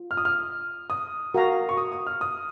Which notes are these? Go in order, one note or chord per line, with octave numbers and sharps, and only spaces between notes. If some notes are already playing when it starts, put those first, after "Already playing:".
Already playing: F4
F6
D#6
F6
D#6
F#4 A#4 F5 A#5
C#6
D#6
D#6
F6
D#6